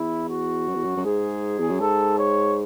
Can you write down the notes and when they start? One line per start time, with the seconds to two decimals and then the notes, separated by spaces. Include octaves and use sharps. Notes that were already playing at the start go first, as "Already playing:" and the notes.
Already playing: E2 E4
0.29 F#4
0.67 F#2
0.75 E2
0.84 F#2
0.97 F#2
1.04 G#2 G#4
1.59 E2
1.70 F#2
1.80 G#2 A4
2.18 C#5